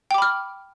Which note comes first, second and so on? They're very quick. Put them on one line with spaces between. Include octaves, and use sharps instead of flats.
G5 D6 B5 F6